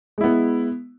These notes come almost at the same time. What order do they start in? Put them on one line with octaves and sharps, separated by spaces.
G#3 E4 B3